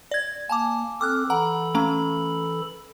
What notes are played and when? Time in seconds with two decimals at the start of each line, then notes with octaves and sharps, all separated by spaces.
0.11 D5 G#6
0.49 A#3 G#5 A5 D6
1.01 C4 A4 D6 F6 F#6
1.30 E3 A4 F#5 A#5 B5
1.75 A3 C#4 A#5